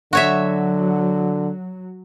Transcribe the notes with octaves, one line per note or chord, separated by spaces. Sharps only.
D3 F#3 F#4 C#5 E5